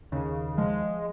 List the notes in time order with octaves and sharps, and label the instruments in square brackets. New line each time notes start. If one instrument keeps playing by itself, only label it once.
[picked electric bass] D#2 [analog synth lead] C#3
[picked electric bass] F3 [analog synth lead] G#3